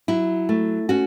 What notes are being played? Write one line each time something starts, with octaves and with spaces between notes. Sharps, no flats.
F#3 E4
A3
C#4 F#4